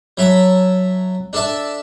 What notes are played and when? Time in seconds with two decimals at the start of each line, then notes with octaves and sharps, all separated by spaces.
0.18 F#3 E5 A5 B5
1.33 D4 A4 D5 E5 A5